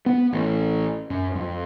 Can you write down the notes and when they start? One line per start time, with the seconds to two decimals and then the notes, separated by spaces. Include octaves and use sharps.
0.06 B3
0.33 A1
1.10 F#2
1.35 F2